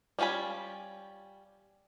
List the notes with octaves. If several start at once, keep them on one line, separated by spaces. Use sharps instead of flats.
G3 C#4 F4 G#5 B5